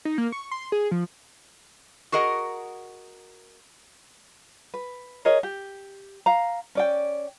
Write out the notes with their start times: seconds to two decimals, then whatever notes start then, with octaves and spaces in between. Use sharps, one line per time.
0.05 D#4
0.18 A#3
0.32 C#6
0.51 C6
0.72 G#4
0.91 F3
2.12 F#4 G#4 A#4 D#5 F#5
4.74 B4
5.25 G#4 A#4 C#5 D#5
5.43 G4
6.26 F5 A#5
6.75 C#4 D5 G5